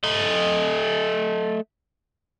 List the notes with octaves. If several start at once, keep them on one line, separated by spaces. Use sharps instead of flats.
A3 D#5